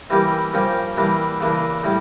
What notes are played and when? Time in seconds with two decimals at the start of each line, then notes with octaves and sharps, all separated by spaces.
0.10 E3 G3 A#3 C#4 G4
0.54 G2 F3 A#3 C#4 G4
0.97 E3 G3 A#3 D4
1.41 C#3 E3 A#3 D4
1.84 A2 G3 C#4